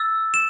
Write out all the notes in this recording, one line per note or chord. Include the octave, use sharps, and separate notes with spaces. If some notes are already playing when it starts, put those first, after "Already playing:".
Already playing: E6 A6
E7